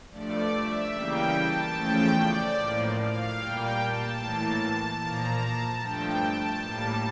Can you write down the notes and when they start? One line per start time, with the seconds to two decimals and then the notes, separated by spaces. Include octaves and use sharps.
0.11 G2 F3 A3 D5
0.53 E5
0.93 C#3 E3 G3 A#3 G5
1.34 A5
1.74 E2 C#3 F3 A3 G5
2.15 D5
2.56 A2 F3 A#3
2.96 F5
3.36 A#2 G3 A#3 G5
3.77 A5
4.18 A2 E3 A#3
4.99 A#2 F3 A#3 A#5
5.39 A5
5.80 G2 F3 A3 G5
6.20 A5
6.61 A2 G3 A#3 A5